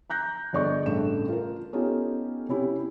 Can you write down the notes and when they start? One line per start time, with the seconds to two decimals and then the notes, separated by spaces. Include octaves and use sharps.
0.10 A#5 F#6 G6 A#6
0.53 G1 G#4 D5 D#5 C#6 G6
0.86 A1 G2 C#3 A3 E7
1.29 F4 A#4
1.73 B3 C#4 D#4 F4 G4 A4
2.48 C3 C#4 E4 G4